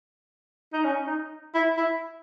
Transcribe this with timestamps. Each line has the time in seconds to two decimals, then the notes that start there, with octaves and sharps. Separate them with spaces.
0.73 D#4
0.84 C#4
1.07 D#4
1.54 E4
1.77 E4